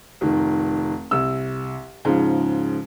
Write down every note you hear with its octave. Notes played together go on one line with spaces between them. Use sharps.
F1 D#3
C2 E6
G#2 C#3 F3